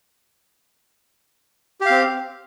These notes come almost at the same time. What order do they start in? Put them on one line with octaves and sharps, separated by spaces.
G4 F5 C4